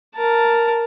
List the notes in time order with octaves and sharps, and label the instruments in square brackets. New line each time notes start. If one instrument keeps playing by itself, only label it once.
[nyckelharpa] A#4 A5